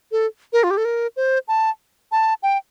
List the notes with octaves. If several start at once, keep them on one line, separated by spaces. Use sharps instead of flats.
A4
A#4
F4
G4
A4
A#4
C5
A5
A5
G5